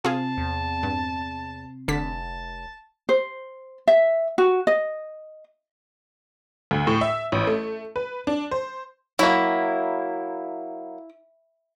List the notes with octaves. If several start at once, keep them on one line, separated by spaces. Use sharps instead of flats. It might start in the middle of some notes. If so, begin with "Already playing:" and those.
C3 C4 F4 G#4 A5
E2
G2
F1 D3 A5 B6
C5
E5
F#4
D#5
D2
A2
E5
A1
A3
B4
D4
C5
F#3 A#3 E4